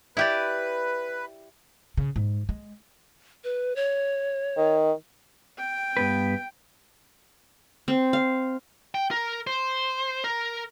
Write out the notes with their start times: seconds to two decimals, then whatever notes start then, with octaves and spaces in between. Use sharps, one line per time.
0.17 E4 G4 B4 D5
1.97 C#3
2.16 G#2
2.49 G#3
3.44 B4
3.76 C#5
4.57 D#3
5.58 G5
5.97 G2 B3 B4
7.88 C4
8.13 F5
8.95 G5
9.11 A#4
9.47 C5
10.24 A#4